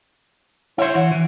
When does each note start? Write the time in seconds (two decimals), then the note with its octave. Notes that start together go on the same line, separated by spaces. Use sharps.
0.78 E4 C5 C#5
0.95 E3 F#5
1.12 E3